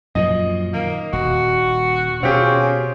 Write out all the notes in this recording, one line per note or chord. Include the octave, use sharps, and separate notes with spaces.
F#2 A#2 F3 D#5
D#3 A#3
D#1 F#4
B2 C4 C#4 F4 G4 G#4